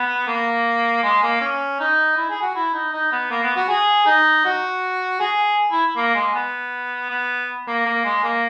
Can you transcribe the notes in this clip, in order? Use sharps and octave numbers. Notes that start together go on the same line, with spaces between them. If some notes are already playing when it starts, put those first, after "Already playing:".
Already playing: B3
A#3
G#3
A#3
C#4
D#4
E4
G#4
F#4
E4
D#4
D#4
B3
A#3
B3
F#4
G#4
D#4
F#4
G#4
E4
A#3
G#3
B3
B3
A#3
A#3
G#3
A#3